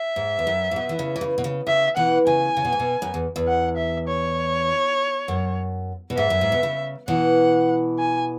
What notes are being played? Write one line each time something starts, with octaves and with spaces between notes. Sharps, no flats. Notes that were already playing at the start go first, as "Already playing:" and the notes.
Already playing: E5
G#2
E2
F#2
G#2
B2
E3
C#3
E3
C#3
B2
C#3
C#3 E5
B2 E3 F#5
C#3 G#5
C#3
B2
G#2
B2
F#2
E2
E2
F#5
E5
C#5
F#2
B2
G#2 E5
F#2
G#2
B2
C#3
B2 E3 F#5
G#5